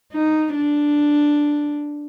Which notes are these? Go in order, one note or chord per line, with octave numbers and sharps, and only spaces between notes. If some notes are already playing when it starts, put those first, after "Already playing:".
D#4
D4